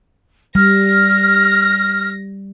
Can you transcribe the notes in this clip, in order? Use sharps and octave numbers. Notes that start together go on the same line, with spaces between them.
G3 F6 A#6